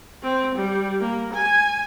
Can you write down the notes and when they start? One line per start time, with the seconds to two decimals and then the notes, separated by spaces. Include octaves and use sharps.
0.23 C4
0.56 G3
1.01 A#3
1.34 G#5